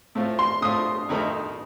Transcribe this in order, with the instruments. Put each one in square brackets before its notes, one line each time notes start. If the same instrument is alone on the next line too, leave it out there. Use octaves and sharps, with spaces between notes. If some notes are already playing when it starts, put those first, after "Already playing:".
[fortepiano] A2 A3 C4 F4
[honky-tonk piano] C6
[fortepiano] A2 A3 C4 F4 [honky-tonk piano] D#6
[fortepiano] F2 D#3 A3 D#4 A#4